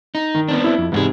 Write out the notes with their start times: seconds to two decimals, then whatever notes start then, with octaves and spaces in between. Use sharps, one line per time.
0.15 D#4
0.35 D#3
0.48 B3 C4 D4
0.64 E4
0.78 F2
0.92 E2 G#2 C3 F4 G#4